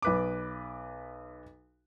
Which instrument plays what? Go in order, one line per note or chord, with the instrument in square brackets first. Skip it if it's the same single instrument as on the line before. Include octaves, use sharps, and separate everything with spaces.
[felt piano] B1 B4 D6